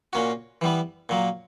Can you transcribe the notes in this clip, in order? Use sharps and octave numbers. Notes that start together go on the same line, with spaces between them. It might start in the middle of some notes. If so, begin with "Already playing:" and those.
A#2 A#3 C#4 F#4
E3 G3 B3
A#2 F#3 A#3